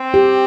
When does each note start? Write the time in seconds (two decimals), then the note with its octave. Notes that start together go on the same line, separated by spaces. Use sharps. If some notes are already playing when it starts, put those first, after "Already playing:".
Already playing: C4
0.14 G4